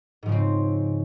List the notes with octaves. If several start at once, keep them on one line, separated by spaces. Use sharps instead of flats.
G#2 C#3 F3 C4